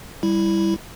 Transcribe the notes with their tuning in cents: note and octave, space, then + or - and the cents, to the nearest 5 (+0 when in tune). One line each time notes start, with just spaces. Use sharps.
G3 +0 E4 +0